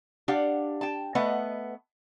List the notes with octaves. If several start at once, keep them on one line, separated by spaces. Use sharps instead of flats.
D4 G4 F5 F#5
G5 A5
A3 B3 B4 D#5 F#5